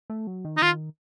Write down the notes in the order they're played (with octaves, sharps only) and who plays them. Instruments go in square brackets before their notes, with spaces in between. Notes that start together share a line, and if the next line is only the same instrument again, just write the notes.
[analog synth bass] A3
F#3
D#3
[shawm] D#4
[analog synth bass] D#3 [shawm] F4